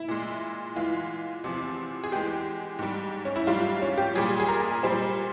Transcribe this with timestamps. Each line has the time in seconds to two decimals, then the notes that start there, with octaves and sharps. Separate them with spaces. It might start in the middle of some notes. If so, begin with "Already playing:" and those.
Already playing: E4
0.08 A#2 G#3
0.75 E2 E3 G#3 F4
1.44 E2 C3 F3
2.04 G#4
2.12 E2 E3 G#3 G4
2.79 G#2 G3
3.25 C#4
3.36 E4
3.47 G#2 G3 F4
3.82 C#4
3.98 G4
4.15 A#2 G3 G#4
4.40 G#4
4.48 A#4
4.83 A#2 G3 C5